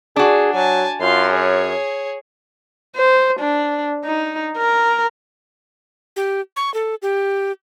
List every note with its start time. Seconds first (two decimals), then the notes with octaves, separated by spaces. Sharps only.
0.16 D4 F#4 G#4
0.54 F#3 G#5 A5
1.01 F#2 F4 C6
1.33 G#4 C#5
2.96 C5
3.39 D4
4.04 D#4
4.57 A#4
6.16 G4
6.56 C#6
6.74 A4
7.02 G4